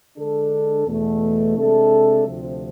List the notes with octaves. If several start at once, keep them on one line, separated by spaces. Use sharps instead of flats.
D3 G#3 D4 A4
E2 B2 A3
C3 G#3 D4 A4 E5
D2 C3 F3